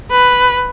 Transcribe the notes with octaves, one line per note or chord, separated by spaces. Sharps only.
B4